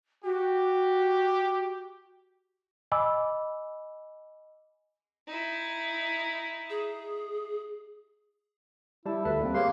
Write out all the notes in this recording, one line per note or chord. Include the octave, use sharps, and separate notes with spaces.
F#4 G4
D#5 G#5 B5 D6 E6
D#4 E4
G#4
G3 E4 A5
D2 A4 B4 E5
G3 A#3 C4
A#3 G4 G#4 C#5 C6